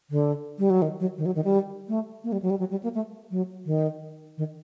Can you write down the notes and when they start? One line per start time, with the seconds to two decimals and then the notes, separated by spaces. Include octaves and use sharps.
0.10 D3
0.58 G3
0.70 F#3
0.82 D#3
1.00 F#3
1.18 D#3
1.26 F#3
1.36 D#3
1.44 G3
1.89 A3
2.24 A#3
2.32 G3
2.42 F#3
2.50 G3
2.59 F#3
2.71 G3
2.83 A#3
2.95 A3
3.31 F#3
3.66 D#3
4.38 D#3